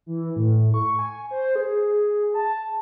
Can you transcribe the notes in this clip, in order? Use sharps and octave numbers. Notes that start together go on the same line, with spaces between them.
E3
A2
C#6
G#5
C5
G#4
A5